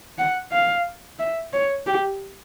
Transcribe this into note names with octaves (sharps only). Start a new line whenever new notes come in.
F#5
F5
E5
C#5
G4